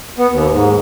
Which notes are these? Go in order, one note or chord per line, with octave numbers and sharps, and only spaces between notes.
B3
D#2
G#2